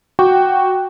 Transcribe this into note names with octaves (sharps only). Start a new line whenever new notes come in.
F#4 F#5 G5 C#6 D6